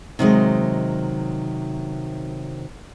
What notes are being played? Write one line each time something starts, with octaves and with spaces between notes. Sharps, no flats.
C3 D#3 F#3 G#3